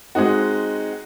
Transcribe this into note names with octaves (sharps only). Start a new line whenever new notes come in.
G#3 C4 D#4 F#4